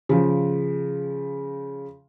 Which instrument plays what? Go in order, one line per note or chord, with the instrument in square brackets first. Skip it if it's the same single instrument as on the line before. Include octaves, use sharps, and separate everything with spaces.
[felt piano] C#3 F3